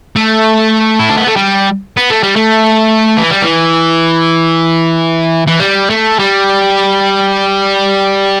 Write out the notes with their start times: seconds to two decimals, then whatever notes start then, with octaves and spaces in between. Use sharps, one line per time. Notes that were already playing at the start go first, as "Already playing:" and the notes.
0.16 A3
0.99 E4
1.09 D4
1.18 B3
1.27 A3
1.36 G3
1.97 B3
2.10 A3
2.23 G3
2.36 A3
3.18 E3
3.31 G3
3.42 E3
5.47 E3
5.60 G3
5.90 A3
6.19 G3